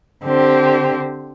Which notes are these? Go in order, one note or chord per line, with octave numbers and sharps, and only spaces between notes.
D3 C4 G4 C5